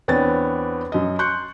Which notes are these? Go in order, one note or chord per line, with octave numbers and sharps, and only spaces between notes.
E2 B3 C4 D4 C#5 A6
F#2 D#5
C6 C#6 F#6 G6 C#7